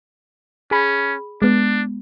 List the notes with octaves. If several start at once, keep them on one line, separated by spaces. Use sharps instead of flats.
C#4 G#4 B5
G#3 B3 D4